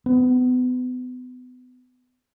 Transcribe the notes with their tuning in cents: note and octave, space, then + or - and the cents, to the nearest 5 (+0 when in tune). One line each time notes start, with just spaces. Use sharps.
B3 +30